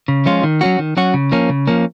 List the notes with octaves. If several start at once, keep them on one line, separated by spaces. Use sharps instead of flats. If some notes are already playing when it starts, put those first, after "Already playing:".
C#3
F3 G#3 C#4 F4
D#3
F#3 C#4 F#4
D#3
F#3 C#4 F#4
C#3
F3 A#3 C#4
C#3
F3 A#3 C#4